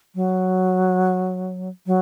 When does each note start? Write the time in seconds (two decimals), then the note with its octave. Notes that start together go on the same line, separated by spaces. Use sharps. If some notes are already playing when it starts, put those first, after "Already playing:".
0.15 F#3
1.87 F#3